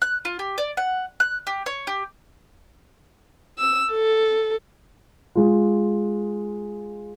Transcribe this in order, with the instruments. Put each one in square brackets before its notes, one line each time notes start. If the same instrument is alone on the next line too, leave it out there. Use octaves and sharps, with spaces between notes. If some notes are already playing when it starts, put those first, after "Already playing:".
[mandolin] F#6
F4
G4
D5
F#5
F#6
G4
C#5
G4
[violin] E6
A4
[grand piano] G#3 F4